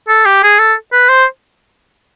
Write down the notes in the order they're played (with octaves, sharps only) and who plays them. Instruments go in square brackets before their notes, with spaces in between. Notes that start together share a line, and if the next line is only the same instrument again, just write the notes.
[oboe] A4
G4
G#4
A4
B4
C5